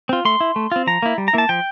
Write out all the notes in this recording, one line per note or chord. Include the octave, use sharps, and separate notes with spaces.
C4 F4
A3 C6
E4
A3
C4 F4
F3 A#5
A#3 E4
G3
A#5
A#3 E4 A5
F3 G5